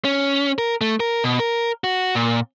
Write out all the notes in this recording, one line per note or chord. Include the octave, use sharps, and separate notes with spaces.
C#4
A#4
A3
A#4
B2
A#4
F#4
A#2